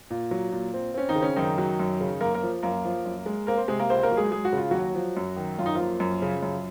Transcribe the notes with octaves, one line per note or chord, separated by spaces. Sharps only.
A#2
F#3
A#2
C4
C4 C#4
D#3 D#4
C#3
C#4
F#2 D#3 D#4
F#3
F#2
C#3
F#2 A#3 A#4
A#3 A#4
F3
F#2 A#3 A#4
F3
F#2
G#3
A#3 C4 A#4
C4 C5
C3 G#3 G#4
A#3 A#4
C#2 C4 C5
A#3 A#4
F#3
G#3 G#4
G#3 G#4
F#4
C#3 F4
D#2 F#3 F#4
F3
F#2
D#3
F#2 F4
D#4
F3 A#3 F4
F#2
C#3
F#2